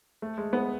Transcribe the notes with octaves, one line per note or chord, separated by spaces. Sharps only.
A3
G#3
G#3 B3